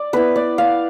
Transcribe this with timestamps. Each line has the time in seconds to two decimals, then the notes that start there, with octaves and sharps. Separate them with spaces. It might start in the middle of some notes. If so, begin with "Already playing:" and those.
Already playing: D5
0.13 B3 E4 B4
0.36 D5
0.58 F5